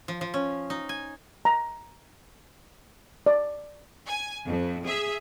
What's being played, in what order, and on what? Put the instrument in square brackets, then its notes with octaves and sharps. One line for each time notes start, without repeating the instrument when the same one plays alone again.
[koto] F3
F3
C#4
D#4
G#5
[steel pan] A#5
D5
[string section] G#5
F2
G#4 E5